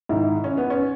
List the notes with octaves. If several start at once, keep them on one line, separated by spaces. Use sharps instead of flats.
G#2 D#3 E4
C#4
B3
C#4